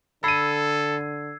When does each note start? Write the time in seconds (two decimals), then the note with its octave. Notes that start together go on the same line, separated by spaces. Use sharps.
0.24 D3 A4 B5 E6 G#6 C7 D#7